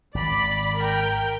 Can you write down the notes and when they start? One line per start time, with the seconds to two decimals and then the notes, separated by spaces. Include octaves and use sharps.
0.15 G#1 D5 B5
0.78 A#4 G5